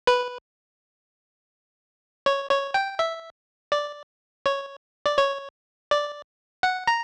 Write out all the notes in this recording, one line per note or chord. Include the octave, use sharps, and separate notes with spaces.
B4
C#5
C#5
G5
E5
D5
C#5
D5
C#5
D5
F#5
A#5